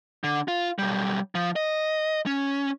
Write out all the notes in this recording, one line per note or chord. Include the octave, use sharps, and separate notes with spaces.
D3
F4
B1 G3
F3
D#5
C#4